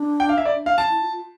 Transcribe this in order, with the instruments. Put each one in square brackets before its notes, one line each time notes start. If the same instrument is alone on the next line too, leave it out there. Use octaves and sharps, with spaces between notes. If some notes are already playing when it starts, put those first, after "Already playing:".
Already playing: [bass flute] D4
[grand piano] G5
F5
E5
D5
[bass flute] D4
[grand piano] F5
A5
[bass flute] E4
F4
F4